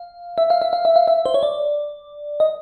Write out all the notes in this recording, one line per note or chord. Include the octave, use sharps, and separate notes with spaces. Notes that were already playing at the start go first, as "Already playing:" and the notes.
Already playing: F5
E5
F5
E5
F5
E5
F5
E5
C5
C#5
D5
D#5